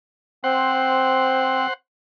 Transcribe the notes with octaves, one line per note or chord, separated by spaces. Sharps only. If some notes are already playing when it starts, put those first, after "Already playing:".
C4 C5 F#5